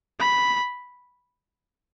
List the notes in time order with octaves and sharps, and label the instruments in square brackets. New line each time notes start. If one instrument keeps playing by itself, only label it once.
[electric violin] B5